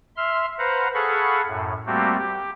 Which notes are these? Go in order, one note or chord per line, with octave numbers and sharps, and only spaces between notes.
E5 C6 F6
B4 C5 F5 F#5 A#5
G#4 A4 F5 F#5 B5 C#6
F#2 A2
G3 A3 A#3 C4 F#4 G4
G4